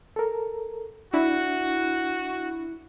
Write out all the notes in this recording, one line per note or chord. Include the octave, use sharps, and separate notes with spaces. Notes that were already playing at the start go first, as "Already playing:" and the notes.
A4 A#4
D4 E4 F#4